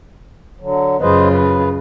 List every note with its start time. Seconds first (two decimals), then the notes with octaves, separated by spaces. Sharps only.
0.61 D3 F#3
1.00 F#2 C#3 F4 B4 C5 D#5
1.32 B4